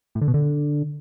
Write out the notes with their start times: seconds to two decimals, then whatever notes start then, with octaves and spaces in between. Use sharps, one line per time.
0.15 A2
0.21 D3
0.28 B2
0.34 D3